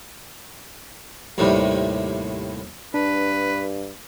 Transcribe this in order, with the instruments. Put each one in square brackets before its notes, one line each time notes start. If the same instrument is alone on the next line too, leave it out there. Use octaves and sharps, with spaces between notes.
[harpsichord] D#2 A2 C3 D#3 G3
[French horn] G2 [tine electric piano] D4 [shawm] B4